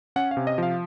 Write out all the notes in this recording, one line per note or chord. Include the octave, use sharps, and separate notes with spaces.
C#4 F#5
F5
C3
D#5
F3 F5